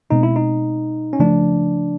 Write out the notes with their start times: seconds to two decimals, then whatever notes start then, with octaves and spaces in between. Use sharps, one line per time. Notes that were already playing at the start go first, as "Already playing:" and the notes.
0.10 B2 G#3 C4 D#4
0.23 E4
0.36 D#4
1.13 C#4
1.19 C#3 F3 A3 D4